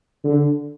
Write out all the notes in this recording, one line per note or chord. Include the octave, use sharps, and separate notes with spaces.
D3